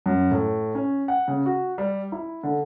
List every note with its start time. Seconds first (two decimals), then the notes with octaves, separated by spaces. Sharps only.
0.06 F#2
0.31 A2
0.75 C#4
1.08 F#5
1.28 C#3
1.46 F#4
1.78 G3
2.12 E4
2.43 D3